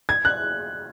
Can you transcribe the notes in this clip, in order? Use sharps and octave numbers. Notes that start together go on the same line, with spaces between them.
G#6
F#6